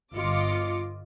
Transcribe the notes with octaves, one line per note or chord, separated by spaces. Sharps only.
G1 F4 D#5 D6 C#7